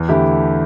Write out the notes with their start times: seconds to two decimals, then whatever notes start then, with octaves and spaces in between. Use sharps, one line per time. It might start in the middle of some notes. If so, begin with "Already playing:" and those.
Already playing: E2
0.09 D3 A3 E4 G4